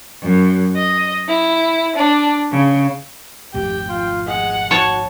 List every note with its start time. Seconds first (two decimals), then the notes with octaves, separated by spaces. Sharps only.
0.21 F#2
0.75 D#5
1.28 E4
1.96 D4
2.51 C#3
3.54 G#1 F2 A3 G4 G5
3.89 F4
4.27 G#3 F#5
4.71 F#4 C#5 A5